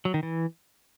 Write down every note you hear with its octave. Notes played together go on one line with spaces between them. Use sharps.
F#3
D#3
E3